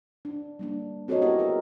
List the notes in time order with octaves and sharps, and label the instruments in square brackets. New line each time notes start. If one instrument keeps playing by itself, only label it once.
[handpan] D4
G3 A#3 D4
C4 F#4 A4 A#4 C#5 D#5
B3 E4 G4 A4 D#5
G4 G#4 A#4